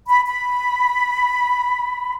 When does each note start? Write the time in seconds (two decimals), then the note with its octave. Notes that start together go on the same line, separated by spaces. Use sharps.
0.08 B5
0.27 B5